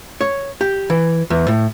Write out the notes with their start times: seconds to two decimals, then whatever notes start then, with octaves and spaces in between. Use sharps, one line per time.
0.21 C#5
0.61 G4
0.90 E3
1.30 E2
1.48 A2